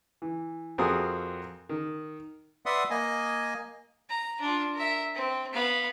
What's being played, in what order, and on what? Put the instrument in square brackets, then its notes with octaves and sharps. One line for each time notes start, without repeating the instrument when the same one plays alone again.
[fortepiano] E3
F2 C4 F#4 G#4 A#4 D#6
D#3
[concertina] B4 D5 E5 F#5 C6 D#6
A#3 D#5 G#5
[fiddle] A#5
D4 F4
A#4 E5
C4
B3 F5